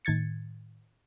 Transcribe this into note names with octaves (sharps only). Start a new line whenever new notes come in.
A2 D#3 G#6 A6 C#7